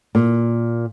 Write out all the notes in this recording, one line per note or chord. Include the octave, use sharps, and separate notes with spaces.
A#2